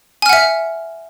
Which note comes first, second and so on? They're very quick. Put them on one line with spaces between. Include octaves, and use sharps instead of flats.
G#5 F6 F#5 E5